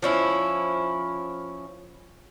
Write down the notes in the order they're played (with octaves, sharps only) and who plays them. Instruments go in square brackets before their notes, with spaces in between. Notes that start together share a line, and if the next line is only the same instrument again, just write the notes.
[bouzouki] F3 C#4 E4